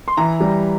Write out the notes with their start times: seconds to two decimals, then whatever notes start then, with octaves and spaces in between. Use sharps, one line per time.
0.08 C6
0.17 E3 A#5
0.40 G3